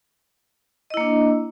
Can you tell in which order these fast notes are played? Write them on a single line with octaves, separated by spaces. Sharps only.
D#5 E4 A#3 D4